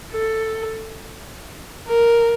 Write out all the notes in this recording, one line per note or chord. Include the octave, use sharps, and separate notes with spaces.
A4
A#4